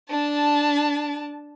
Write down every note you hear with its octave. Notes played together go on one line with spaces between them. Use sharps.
D4 A5